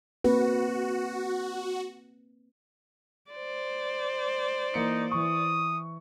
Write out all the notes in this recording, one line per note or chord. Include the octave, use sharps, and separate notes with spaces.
A#3 C4 F#4 B4
C5 D5
E3 A#3 D#4 C#7
E3 C#6 D#6